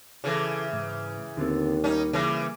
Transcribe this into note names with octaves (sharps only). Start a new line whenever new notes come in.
C#3 E3 E4 A4
G#2
D#2 D3 B3 C4
G3 A#3 C#4 D#4
C#3 E3